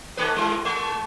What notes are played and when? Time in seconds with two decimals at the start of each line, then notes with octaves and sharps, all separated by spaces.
0.17 D#2 A3 B4
0.36 G3 E4
0.65 G#3